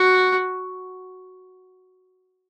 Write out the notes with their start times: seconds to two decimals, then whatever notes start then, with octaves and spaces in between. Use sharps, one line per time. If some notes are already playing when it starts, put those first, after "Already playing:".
Already playing: F#4